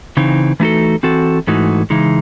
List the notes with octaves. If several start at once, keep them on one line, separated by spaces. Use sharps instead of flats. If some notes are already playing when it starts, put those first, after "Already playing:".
C#3 E3 C4 D#4
E3 A3 D#4 F#4 A4
E3 C4 F#4 A4
G#2 E3 A3 D#4 F#4
C#3 E3 G#3 D#4